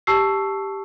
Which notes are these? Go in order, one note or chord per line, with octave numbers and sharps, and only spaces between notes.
G4 A5 C#6 E6 C7